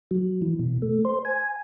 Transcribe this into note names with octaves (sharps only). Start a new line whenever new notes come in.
F#3
E3
B2
A3
C5
G#5